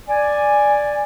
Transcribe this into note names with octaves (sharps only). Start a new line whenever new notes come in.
D5 G#5